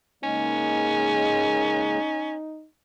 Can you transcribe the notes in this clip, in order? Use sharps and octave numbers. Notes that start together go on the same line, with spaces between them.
C#3 G#3 A#3 C#4 D#4